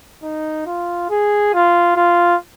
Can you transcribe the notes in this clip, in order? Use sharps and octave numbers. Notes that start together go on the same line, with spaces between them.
D#4
F4
G#4
F4
F4